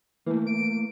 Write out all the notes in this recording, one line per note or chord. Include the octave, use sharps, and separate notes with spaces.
E3 A3 A#3
D7